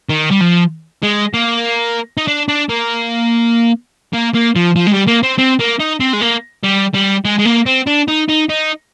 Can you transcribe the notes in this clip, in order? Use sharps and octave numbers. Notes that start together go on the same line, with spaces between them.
D#3
G3
F3
G#3
A#3
D#4
D4
D4
A#3
A#3
A#3
F3
F3
G#3
G3
A#3
C4
C4
A#3
D#4
C4
G#3
A#3
G3
G3
G#3
G#3
A#3
C4
D4
D#4
D#4
D#4